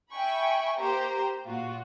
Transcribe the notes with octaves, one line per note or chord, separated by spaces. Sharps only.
E5 G5 G#5 B5 C#6
A#3 G4 C5 A#5
A#2 F4 F#4